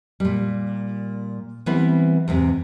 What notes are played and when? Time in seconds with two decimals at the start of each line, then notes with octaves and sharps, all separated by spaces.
0.20 A#2 G3
1.66 E3 G3 B3 C4 E4
2.28 E2 G#2 C3